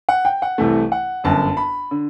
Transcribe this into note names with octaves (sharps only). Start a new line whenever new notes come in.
F#5
G5
F#5
C2 C3 E3 A3
F#5
G1 F#2 D3 A5
B5
D3